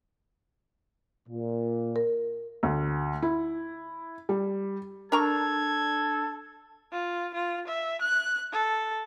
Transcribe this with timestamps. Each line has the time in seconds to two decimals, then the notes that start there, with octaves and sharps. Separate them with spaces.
1.29 A#2
1.96 A#4
2.63 D2
3.22 E4
4.29 G3
5.12 D4 A4 A#4 A#5 C#6 G#6
6.92 F4
7.34 F4
7.67 E5
8.02 F#6
8.52 A4